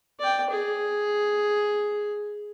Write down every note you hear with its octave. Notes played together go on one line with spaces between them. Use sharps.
D5 G5
G#4